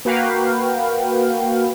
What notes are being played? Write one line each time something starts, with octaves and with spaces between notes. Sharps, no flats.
A#3 F#4 B4 F5 G5